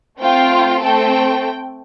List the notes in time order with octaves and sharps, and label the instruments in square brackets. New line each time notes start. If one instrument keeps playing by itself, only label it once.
[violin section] A3 C4 F4 G5
A3 C4 A4 G5